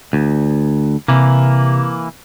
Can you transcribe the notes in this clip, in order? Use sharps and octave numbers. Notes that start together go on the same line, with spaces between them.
D2
C3 E3 A#3